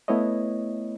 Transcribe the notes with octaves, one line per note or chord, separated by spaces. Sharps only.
A3 B3 E4 B4 C#5 D#5